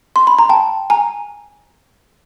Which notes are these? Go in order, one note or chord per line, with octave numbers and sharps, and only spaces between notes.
C6
B5
A#5
G5 A5
G#5 A#5